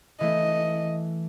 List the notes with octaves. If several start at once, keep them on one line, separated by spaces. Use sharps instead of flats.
E3 A3 D#5